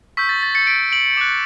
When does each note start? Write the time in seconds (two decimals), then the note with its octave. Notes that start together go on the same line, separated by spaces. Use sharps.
0.17 C#6 E6 G6 B6
0.29 A6
0.43 A6
0.55 A6 C#7
0.67 B6 D7
0.92 D7 F#7
1.17 D6 F#6